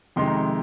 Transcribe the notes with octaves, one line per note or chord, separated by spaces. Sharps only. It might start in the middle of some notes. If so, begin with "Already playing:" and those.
F2 C3 D#3 G#3 D#4 C6
A#5
C6